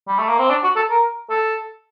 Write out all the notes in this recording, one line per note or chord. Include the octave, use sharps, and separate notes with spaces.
G3
A3
A#3
C4
D4
F#4
A4
A#4
A4